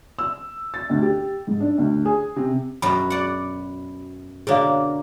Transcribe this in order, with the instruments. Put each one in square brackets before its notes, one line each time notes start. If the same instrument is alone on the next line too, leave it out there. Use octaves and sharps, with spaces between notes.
[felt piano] E6
A6
D2
G4
G#2
D4
D2
G#4
C3
[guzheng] F#2 B2 F#3 [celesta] B5
[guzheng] D5 F#5
[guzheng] B2 D3 A#3 [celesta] G#4 C#5 F5